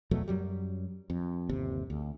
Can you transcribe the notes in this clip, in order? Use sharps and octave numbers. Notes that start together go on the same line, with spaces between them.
E2 B2 F#3 A3
F#2 F#3 G3
F2
G1 D#2 C3
D2